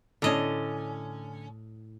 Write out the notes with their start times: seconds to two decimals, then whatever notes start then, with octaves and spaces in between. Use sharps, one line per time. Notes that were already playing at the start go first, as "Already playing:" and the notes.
0.22 A2 D3 C#4 D#5